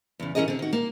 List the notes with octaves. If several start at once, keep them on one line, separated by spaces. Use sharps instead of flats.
E2 C#3
E3 F3 C#4 G#4 A#4 D#5
D3 C4
D#3 F#4
A#3